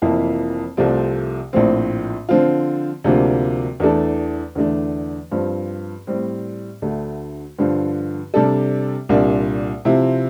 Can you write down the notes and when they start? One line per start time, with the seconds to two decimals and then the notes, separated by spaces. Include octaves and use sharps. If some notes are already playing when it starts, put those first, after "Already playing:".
0.02 F1 F2 E3 A#3 E4
0.77 C2 C3 F3 A3 C4
1.53 A#1 A2 F3 C4
2.29 D3 F3 C4 F4
3.04 D2 C3 F3 A#3 D4
3.80 E2 E3 A3 D4 A4
4.55 E2 D3 A3 D4
5.31 G2 F3 C4
6.07 A2 G3 C4
6.82 D2 D3 A3
7.58 G2 D3 F3
8.34 C3 G3 D4 A4
9.09 C2 A#2 G3 D4
9.85 C3 F3 C4 E4